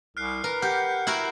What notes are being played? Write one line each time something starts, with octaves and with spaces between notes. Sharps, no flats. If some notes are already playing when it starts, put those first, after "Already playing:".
C2 F6 F#6 C7
A#4 B4
G4 F#5 F6 G6
E4 F#4 A#4